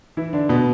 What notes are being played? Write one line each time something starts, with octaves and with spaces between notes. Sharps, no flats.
E3 E4
D3 D4
B2 B3